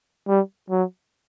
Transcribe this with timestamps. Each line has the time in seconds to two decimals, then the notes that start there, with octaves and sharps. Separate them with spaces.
0.28 G3
0.70 F#3